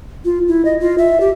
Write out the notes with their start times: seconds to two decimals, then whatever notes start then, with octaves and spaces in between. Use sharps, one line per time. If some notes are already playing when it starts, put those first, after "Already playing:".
0.25 F4
0.48 E4
0.65 D#5
0.80 F4
0.98 E5
1.21 G4